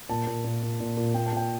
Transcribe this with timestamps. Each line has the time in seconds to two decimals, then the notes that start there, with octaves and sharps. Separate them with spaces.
0.09 A#2 A5
0.27 A#2
0.44 A#2
0.62 A#2
0.80 A#2
0.97 A#2
1.14 A#2 G5
1.26 A5
1.32 A#2 G5